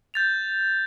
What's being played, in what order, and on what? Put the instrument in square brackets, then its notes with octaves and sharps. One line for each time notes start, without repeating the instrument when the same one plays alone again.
[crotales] G6 A6 F7